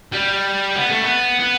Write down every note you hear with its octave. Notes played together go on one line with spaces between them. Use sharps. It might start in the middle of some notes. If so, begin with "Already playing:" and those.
G3
B3
A3
B3
B3